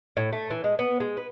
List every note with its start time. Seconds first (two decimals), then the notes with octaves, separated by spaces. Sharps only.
0.17 A2
0.33 A3
0.50 E3
0.64 G#3
0.79 B3
1.00 G#3
1.17 B4